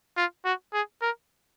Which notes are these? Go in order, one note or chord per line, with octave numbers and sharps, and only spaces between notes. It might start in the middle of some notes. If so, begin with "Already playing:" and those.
F4
F#4
G#4
A#4